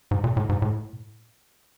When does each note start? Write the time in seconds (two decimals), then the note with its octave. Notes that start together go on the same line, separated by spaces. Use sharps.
0.11 G#2
0.24 A#2
0.37 A2
0.49 G#2
0.62 A2